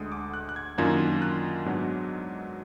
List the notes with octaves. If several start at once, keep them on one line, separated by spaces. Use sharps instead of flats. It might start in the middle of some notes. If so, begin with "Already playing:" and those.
Already playing: D2 D3 G#3 D#6
D6
F#6
F#6
G#6
F#2 D#3 A#3 D4 F4 G#6
F#6
G#2 F#3 B3 D4